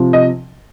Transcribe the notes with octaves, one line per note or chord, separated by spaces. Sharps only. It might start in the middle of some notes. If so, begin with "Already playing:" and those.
Already playing: C3 F3
D#5